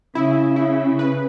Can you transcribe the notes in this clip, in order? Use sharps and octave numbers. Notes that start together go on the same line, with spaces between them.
C#3 E4
E4
B4